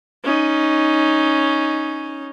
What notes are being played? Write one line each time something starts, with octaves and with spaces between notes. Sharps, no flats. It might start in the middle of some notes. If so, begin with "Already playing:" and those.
C#4 D#4